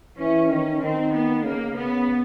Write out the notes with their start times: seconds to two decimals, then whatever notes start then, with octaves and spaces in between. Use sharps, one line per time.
0.18 E3 C#4
0.50 D#3 C#4
0.81 D#3 C4
1.13 B3
1.44 C#3 A#3
1.76 C#3 B3